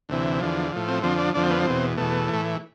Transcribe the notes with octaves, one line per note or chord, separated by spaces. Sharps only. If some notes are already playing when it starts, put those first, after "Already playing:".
D2 C3 E3
E2 D3 F3
A2 F3
C4
F2 D3 F3 C4
D4
F2 D3 F3 D4
C4
B3
C4
E2 B2
E2 B2 A3
A2 E3